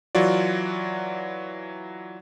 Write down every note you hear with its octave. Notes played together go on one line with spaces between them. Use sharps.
E3 F#3 F4 F#4 D5